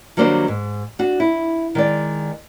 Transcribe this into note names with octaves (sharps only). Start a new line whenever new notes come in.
D#3 F#3 G3 A#3 D4 C5
G#2
D4 F#4
E4
D#3 G#3 D5